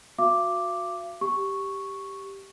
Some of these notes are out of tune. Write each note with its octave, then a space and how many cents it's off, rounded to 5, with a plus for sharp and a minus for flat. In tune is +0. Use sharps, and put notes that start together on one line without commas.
F#4 -25 F5 -45 D6 +0
G4 +0 C#6 +0